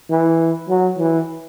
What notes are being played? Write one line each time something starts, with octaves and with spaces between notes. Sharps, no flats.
E3
F#3
E3